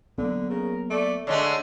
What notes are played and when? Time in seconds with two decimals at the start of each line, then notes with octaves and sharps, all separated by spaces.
0.18 D3 F#3 A#3 B3
0.50 C#3 A#4
0.90 A3 D5
1.27 D3 G#3 A3 D4 C#5